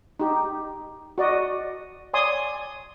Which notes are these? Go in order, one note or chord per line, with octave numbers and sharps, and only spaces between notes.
D#4 G4
F#4 D5 D#5
C#5 D5 G#5 C6 D#6